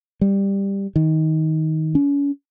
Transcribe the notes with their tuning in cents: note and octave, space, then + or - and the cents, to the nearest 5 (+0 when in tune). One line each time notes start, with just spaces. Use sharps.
G3 +10
D#3 +20
C#4 +35